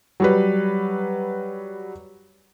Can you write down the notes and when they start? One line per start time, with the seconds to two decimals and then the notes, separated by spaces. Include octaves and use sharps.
0.20 F#3 G3 B4